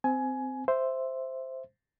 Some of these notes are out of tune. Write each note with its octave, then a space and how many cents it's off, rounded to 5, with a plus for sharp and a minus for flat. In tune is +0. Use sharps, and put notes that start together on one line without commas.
C4 -15 G#5 +15
C5 +0 E5 +0